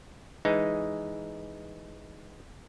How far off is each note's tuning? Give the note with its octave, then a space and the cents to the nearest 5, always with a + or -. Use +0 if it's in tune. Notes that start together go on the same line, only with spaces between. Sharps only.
E3 +0 G#3 +0 D#4 +0